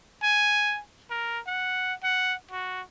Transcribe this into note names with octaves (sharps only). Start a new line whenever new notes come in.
G#5
A#4
F#5
F#5
F#4